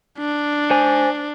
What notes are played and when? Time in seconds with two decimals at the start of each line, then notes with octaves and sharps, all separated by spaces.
0.18 D4
0.71 C5 G#5